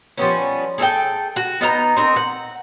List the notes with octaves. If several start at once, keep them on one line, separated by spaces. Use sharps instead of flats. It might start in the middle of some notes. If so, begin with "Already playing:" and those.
F3 G3 B3 C#4
G#4 A4 D#5 G5
F#4
B3 D#4 F5 A#5
C4 D#4 A#4
F#5